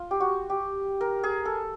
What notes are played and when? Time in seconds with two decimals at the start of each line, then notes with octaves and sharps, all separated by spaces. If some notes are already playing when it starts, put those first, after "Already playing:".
Already playing: F4
0.11 G4
0.20 F#4
0.50 G4
1.01 A#4
1.23 G#4
1.45 A4